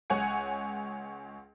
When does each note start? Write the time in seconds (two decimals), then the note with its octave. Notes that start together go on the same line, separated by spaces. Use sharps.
0.10 C#2 C#5 F#5 G#5 C#7